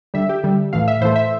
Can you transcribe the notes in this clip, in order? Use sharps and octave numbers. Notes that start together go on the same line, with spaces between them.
D3 G3 E5
G4
D3 G3
A2 E3 A3 F5
E5
A2 E3 A3 C5
E5